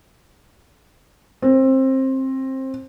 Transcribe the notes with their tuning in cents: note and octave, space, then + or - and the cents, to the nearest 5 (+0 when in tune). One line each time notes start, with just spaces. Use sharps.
C4 +20